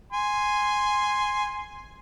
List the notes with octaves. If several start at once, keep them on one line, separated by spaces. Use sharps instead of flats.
G#5 C6